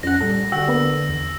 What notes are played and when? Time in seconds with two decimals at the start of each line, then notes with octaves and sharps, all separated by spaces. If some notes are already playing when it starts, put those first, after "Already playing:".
0.03 F2 C#4 F#5 A#6
0.20 A#2 G3 A4
0.52 D3 F#4 G4 E6
0.68 A#3 B3
1.09 E2